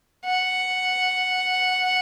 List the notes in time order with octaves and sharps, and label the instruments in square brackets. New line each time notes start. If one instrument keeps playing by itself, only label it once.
[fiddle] F#5